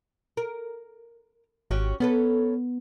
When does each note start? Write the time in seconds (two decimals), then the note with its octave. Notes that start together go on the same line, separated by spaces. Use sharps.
0.37 A#4
1.71 G#1 C#4 F#4 G4
2.00 B3 C#4 A4 B4